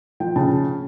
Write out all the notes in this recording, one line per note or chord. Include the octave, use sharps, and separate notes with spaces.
F3 G5
C#3 A5